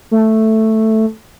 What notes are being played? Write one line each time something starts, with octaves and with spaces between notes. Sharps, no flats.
A3